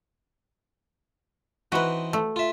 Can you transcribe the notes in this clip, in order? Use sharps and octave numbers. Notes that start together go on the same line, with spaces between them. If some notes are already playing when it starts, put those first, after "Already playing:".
E3 C4 D#4 F#4 B4
A3
F4 E5